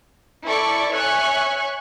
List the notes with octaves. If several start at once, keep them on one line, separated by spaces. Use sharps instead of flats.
E4 A4 D5 C#6
C#5 E5 G#5 C#6 F#6